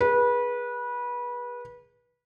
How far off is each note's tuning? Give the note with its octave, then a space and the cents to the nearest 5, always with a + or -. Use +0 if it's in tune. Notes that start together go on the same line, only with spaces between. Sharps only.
G#4 -5 B4 -25